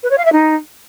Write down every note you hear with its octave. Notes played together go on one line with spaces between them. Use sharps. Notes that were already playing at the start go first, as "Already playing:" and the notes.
B4
C#5
F5
E5
D#4